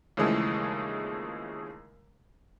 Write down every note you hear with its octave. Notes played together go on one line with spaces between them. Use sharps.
D#2 C#3 E3 F3 G#3 A3